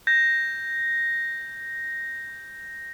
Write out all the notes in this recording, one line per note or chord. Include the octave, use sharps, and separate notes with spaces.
G6 A#6